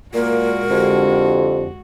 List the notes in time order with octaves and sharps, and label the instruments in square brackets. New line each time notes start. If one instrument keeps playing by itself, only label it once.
[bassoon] A#2 [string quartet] G#3 F#4 [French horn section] A#3 [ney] A#4
[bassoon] F2 [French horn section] D3 G4